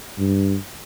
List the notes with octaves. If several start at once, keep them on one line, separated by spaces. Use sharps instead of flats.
G2